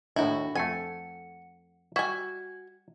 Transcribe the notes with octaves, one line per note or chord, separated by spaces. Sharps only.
D#2 A2 D4 E4 F#4
F2 A3 F#5 G#5 C#7
G3 F#4 E5 G#5 G#6